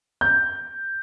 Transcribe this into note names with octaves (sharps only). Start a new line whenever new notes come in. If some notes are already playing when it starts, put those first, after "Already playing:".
G6